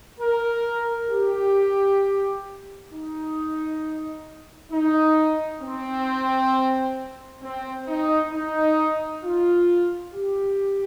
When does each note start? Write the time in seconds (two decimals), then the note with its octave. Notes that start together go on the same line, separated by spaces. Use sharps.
0.20 A#4
1.10 G4
2.91 D#4
4.72 D#4
5.61 C4
7.42 C4
7.88 D#4
8.32 D#4
9.23 F4
10.12 G4